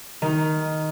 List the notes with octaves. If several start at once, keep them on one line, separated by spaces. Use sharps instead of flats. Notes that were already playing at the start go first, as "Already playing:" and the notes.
D#3